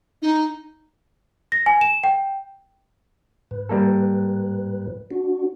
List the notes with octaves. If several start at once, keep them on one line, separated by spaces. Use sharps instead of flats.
D#4
A#6
G#5
E7
G5
G#2 B4
G3 A#3 A4
D4 F#4